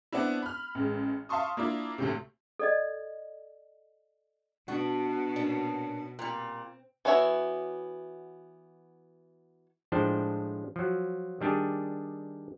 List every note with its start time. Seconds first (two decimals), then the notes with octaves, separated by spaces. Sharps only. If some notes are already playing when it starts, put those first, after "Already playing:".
0.13 B3 C4 D4 E4
0.42 B5 F6
0.75 A1 G#3
1.29 E5 F5 A5 C6 C#6 D#6
1.57 A#3 D4 E4 F4
1.98 D2 A2 C3
2.59 A4 D5 D#5
4.68 B2 D4 F#4
5.36 A#2 C#4 D4
6.19 A#2 G3 C4
7.05 E3 B3 F#4 C#5 E5
9.92 A2 F3 G#3 D4 C5 G5
10.76 F3 F#3
11.41 D#3 G3 D4 G4 G#4